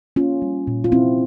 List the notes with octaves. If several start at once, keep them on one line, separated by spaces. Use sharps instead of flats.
A#3 C#4 F4
G3
A#2
F4
A#2 C4 E4